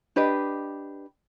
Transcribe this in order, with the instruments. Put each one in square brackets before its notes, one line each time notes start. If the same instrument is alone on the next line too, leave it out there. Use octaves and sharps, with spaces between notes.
[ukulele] D4 G4 B4 D#5